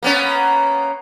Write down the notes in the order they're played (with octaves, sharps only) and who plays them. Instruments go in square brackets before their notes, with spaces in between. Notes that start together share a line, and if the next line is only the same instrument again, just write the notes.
[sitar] A#3 B3 C#4